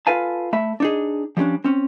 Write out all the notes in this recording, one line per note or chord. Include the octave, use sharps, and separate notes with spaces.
F4 A4 B4 F5 G#5 A5
A3 E5 B5
D4 D#4 G#4
F3 G3 G#3 C#4 D4
C4 C#4